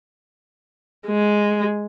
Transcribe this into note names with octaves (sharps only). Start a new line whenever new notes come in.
G#3